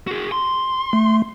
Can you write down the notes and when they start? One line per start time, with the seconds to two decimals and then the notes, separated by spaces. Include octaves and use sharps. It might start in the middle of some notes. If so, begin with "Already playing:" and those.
0.07 F#4 G#4
0.32 C6
0.93 A3